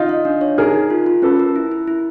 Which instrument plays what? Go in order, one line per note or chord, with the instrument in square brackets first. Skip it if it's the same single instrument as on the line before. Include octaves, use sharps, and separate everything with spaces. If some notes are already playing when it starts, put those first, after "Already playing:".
Already playing: [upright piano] D#4 F4
[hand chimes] F5
D4
C#5
[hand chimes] D#4 [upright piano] G#4 A#4
[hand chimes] D#4
F4
F4
[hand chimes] C#4 [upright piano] A4 B4
[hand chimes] A#4
E4
E4
E4